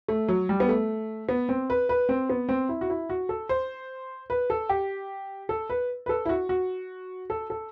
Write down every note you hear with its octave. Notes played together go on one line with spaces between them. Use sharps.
A3
F#3
G3
B3
A3
B3
C4
B4
B4
C4
B3
C4
E4
F#4
E4
F#4
A4
C5
B4
A4
G4
A4
B4
B4
A4
E4
F#4
F#4
A4
A4